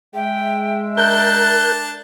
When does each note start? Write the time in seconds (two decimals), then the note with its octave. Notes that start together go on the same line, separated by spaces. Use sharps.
0.14 G#3 E5 G5
0.97 D4 A#4 A5 F#6 G6